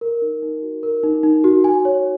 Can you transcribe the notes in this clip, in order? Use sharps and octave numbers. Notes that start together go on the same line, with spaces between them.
A#4
D#4
D#4
F#4
A#4
D#4
D#4
F#4
G#5
C#5